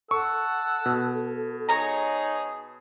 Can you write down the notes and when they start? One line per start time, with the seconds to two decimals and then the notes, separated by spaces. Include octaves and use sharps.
0.11 A4 F#5 A5 C#6 E6
0.86 B2
1.69 D#4 G#4 C#5 A#5